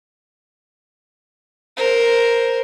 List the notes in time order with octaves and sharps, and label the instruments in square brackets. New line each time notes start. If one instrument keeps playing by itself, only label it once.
[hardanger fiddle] A#4 C5